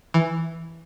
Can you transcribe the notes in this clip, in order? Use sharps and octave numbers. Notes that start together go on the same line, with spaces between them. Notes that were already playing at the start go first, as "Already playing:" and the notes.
E3